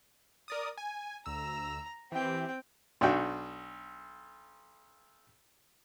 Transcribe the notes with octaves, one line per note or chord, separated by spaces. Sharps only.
A#4 D5 D#6
G#5
D2 A#5 E6
E3 C4 G4 G5
B1 D4 F#4 G5